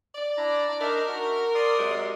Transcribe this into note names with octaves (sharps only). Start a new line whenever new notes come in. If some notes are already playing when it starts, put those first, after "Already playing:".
D5
D4 E4 A#5
D4 D#4 A#4 E5
F#4
D5 C6 D#6
C3 F#3 G#3